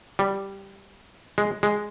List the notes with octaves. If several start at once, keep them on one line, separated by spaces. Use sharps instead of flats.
G3
G#3
G#3